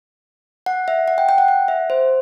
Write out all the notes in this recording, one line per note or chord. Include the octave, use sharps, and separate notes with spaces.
F#5
E5
F#5
G5
G5
F#5
F#5
E5
C5